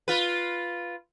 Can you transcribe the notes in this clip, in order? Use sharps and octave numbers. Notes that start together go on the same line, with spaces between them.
F4 B4